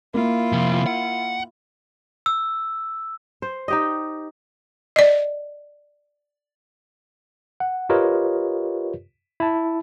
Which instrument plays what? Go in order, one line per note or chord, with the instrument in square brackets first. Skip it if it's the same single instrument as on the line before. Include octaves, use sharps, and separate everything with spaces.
[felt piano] A#3 [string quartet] E4 F4
[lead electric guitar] C3 F3
F#5
[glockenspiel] E6
[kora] C5
D#4 G4 D#5
[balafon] D5 D#5
[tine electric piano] F#5
F4 G4 A#4 B4 C#5 D#5
E4 A5